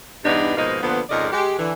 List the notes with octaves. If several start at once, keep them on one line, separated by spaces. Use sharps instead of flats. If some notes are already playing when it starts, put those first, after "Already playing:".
E2 G2 E3 B3 D4 D#4
G#2 B2 F3 A#3 D#4
A#2 D3 F3 B3
F2 G#2 C#3 A#4 D5 D#5
G#3 G4
D3 E3